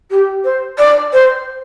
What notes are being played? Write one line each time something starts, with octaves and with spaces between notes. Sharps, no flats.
G4
C5
D5
C5